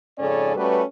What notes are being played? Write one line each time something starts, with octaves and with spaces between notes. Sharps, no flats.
F2 G#2 C#3 C#4 A4 D5
G3 A3 C#4 F#4 B4